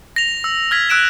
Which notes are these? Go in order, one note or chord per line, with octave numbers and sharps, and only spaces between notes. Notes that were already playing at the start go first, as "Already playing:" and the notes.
A#6 F7
E6
F6 G#6 B6
E6 F#6 D7 E7